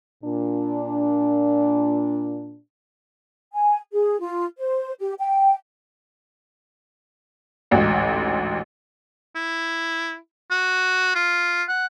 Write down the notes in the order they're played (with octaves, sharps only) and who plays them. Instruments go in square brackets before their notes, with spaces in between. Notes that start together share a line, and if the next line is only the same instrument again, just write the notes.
[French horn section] A#2 D4
[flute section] G#5
G#4
F4
C5
G4
G5
[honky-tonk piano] A1 D2 G#2
[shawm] E4
F#4
F4
F#5